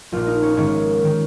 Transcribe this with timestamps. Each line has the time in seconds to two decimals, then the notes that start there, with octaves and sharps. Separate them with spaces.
0.12 A#1 A#2 F4
0.27 D#4
0.42 C#4
0.57 G#1 G#2 D#3 C#4
1.05 D#3